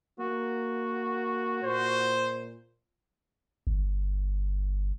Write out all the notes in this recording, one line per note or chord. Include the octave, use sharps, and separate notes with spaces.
A#3 F#4
A#2 C5
G1